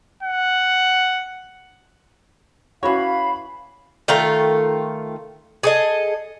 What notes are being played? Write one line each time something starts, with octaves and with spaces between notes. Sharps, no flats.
F#5
E3 C#4 F#4 C#5 F5 B5
D#3 A3 F4 A#5
G#4 A4 D#5